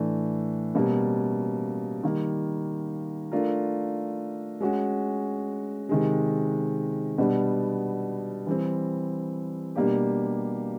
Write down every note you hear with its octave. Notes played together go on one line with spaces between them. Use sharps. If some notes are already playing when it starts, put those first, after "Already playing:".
Already playing: A2 E3 A3 D4
B2 G3 A#3 C#4
D#3 G3 A#3
A3 D4 F4 A#4
G#3 C#4 F#4
C3 D#3 G#3
B2 G3 B3 D4
E3 G3 C4
B2 G3 A#3 D4 G4